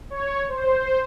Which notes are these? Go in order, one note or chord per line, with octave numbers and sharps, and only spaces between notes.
C#5
C5